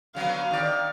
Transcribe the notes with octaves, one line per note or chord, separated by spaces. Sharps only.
D3 F#3 B3 F5
D#3 D5